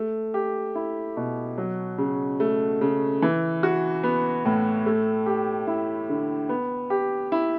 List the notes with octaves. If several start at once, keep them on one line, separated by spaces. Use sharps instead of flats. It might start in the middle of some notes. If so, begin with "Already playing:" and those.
Already playing: A3
G4
E4
B2
F#3
C#3
A3
C#3
E3
F#4
B3
A2
A3
G4
E4
D3
B3
G4
E4